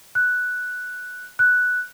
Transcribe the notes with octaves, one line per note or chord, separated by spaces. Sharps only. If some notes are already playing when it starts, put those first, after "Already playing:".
F#6
F#6